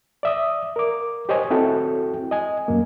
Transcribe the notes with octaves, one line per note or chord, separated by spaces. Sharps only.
D5 E5 D#6
A#4 D6
G4 C5 C#5 D#5 G#5
C4 E4 F#4 A4 G5
D#5 G#5
F#2 A#3